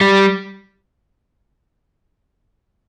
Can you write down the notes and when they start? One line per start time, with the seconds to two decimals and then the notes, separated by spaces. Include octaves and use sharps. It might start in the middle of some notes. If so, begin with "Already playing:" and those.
0.01 G3